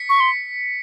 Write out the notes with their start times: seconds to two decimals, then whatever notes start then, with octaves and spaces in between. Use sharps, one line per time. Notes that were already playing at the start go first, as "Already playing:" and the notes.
Already playing: B6 C#7
0.09 C#6
0.20 C6